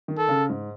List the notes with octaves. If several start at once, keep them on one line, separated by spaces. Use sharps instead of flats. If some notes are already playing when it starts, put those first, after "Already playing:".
D#3
A4
C#3
G#2